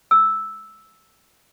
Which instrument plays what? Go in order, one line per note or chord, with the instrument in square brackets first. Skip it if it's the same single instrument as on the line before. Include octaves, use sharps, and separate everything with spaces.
[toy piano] E6